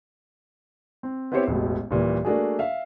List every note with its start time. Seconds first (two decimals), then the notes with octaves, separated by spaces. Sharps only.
1.03 C4
1.32 B3 C4 E4 G4 C5 C#5
1.47 E1 A1 B2
1.91 D#1 A#2 E3
2.25 A3 A#3 D4 F#4 G#4
2.59 E5 F5